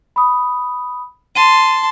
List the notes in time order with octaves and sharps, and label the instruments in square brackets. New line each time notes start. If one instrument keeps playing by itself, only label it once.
[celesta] B5 D#6
[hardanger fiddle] A5 C6 [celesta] D#7